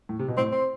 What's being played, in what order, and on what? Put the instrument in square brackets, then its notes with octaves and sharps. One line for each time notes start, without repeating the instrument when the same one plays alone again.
[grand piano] A2
C3
B2
[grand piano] A2 [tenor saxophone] C4
[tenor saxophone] C4